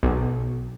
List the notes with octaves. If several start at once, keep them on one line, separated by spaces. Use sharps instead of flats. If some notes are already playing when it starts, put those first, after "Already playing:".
B1